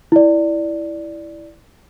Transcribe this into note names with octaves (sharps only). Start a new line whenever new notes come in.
E4 D5